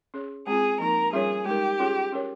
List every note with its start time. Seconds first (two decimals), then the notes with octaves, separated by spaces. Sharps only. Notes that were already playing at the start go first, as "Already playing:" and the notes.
0.14 C#4 G#4 C#5
0.47 G#3 C4 F4 G#4
0.79 F3 A#3 D#4 A#4
1.13 G3 C#4 F4 G#4 A#4 C#5
1.46 G#3 D#4 G4 A#4
1.79 C#4 F4 G#4 C#5
2.12 C#4 G4 A#4 C#5